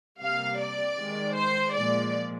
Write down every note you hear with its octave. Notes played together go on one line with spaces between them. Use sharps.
C3 G3 A#3 F5
D5
D#3 G#3
C5
A#2 F3 G#3 D5